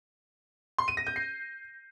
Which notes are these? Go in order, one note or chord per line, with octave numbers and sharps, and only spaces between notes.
C6
D#7
A#6
G6
C7